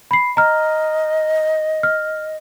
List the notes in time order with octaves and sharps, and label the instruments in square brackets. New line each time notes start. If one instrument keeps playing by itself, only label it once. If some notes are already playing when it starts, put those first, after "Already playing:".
[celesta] B5 C7
[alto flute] D#5 [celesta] A#5 F6
[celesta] F6